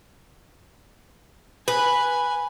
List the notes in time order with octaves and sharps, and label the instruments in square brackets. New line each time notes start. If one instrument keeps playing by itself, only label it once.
[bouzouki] B4 [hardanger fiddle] G#5